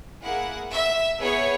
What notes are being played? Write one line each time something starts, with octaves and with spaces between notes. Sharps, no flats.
A#3 E4 G#4 F#5
E5
B3 E4 G#4 C#5